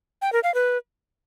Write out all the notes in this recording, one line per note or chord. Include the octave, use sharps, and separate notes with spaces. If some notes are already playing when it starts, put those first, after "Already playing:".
G5
A#4
F5
B4